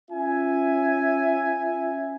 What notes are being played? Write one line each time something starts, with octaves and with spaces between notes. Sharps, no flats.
C#4 F4 E5 G#5